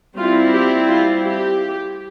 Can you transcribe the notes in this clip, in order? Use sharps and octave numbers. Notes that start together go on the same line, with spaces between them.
G3 C4 E4 F4
G4
F4
G4